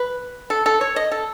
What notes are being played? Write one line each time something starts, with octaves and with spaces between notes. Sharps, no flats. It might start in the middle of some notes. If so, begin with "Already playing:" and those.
Already playing: B4
A4
A4
C#5
D#5
A4